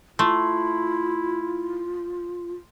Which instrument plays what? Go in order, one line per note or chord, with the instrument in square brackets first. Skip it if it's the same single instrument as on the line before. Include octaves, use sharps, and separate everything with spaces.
[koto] A3 [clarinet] E4 [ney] F4 [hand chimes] C6